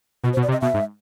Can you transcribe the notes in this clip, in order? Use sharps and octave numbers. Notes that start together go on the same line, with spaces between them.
B2 F#4
C5
B2
D5
C3
D#5
B2 E5
G#2